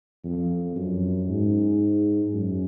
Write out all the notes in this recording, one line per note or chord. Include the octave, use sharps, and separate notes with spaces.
F2
F#2
G#2
F#2